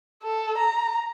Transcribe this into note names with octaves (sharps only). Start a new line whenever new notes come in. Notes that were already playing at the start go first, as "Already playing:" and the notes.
A4
A#5